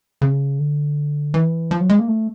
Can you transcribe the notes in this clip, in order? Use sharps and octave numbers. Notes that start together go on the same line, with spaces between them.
C#3
D3
E3
F3
F#3
G#3
A#3
A3